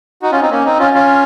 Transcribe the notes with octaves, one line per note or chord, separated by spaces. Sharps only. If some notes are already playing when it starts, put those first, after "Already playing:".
D#4 F#4
C#4 F4
C4 D#4
A#3 C#4
C4 D#4
C#4 F4
C#4 F4